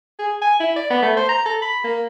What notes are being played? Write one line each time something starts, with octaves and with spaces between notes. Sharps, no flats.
G#4
G#5
E4
D5
B3
A3
C5
A#5
A4
B5
A#3